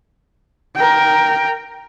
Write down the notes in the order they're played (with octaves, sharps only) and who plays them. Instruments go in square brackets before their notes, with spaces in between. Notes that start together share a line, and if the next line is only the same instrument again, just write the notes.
[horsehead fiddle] A#4 G5